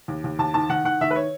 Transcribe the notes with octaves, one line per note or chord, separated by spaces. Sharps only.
D#2
D#2
D#2 A5
D#3 A5
D#3 F#5
D#3 F#5
D#3 E5
B4
C#5